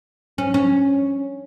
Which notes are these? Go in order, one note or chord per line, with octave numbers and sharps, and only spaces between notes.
C#4
C#4